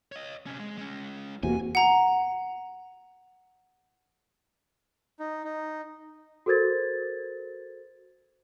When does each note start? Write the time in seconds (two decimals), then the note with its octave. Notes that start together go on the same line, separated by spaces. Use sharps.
0.12 C#5 D#5
0.46 C3 C#4
0.59 G#3
0.78 G#3 C#4
1.43 E2 C3 A#3 F#4 G#5
1.75 F#5 A#5
5.20 D#4
5.44 D#4
6.46 F#4 A4 A#4 C5 G#6 A6